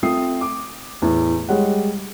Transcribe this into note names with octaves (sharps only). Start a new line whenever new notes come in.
A3 C4 F4 D#6 C7
D6
E2 A2
G3 G#3 C#5 F#5